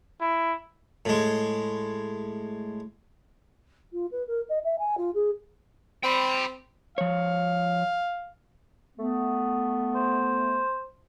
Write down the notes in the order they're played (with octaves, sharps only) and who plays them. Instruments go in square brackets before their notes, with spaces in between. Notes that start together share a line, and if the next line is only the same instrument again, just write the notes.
[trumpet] E4
[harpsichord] A2 G#3
[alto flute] F4
B4
A#4
D#5
E5
G#5
F4
G#4
[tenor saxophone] C4 [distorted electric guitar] G5 B5
[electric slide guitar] F3 C#5 [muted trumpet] F5
[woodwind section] A3 B3
[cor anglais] C5